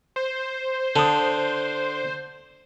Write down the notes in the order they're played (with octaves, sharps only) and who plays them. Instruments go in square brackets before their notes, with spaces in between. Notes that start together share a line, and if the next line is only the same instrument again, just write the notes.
[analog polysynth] C5
[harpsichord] D3 [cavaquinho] A5 D#6